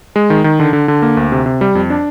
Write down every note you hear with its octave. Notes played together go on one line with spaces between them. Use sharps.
G#3
D#3
D#3
D3
D3
D3
A#3
D2
C3
C3
G3
F2
D4